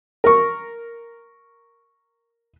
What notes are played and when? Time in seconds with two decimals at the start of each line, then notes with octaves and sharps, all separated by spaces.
0.24 A#4 C#6